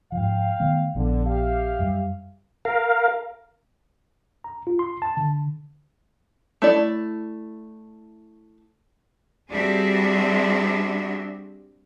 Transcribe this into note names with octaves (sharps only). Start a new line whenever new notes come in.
G#2 F3 F5 G5
D#3 A3 B3
A#1 D3 F3 B3
G4 E5 F5
F#2 G3
A#4 F5
A#5
F4
C6
A5
D3
A3 E4 D5
G3 C4 D4 F#4 G#4 E5